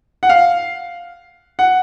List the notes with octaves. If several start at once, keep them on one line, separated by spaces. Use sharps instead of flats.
F#5
F5
F#5